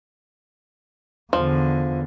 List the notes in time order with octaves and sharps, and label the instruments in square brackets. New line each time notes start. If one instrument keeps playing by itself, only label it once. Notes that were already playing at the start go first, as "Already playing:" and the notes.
[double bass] E2 D3 [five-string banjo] F3